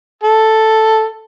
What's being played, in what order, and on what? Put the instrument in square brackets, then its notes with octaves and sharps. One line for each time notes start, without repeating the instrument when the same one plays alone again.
[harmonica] A4